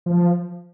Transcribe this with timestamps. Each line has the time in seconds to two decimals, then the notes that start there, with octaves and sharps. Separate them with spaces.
0.06 F3